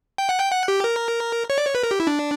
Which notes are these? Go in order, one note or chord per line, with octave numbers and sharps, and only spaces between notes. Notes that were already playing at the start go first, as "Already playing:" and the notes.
G5
F#5
G5
F#5
G4
A#4
C#5
D5
C#5
B4
A#4
G4
E4
D4